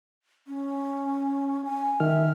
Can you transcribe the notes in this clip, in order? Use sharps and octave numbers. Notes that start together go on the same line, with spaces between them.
C#4
G#5
D#3 E5 F6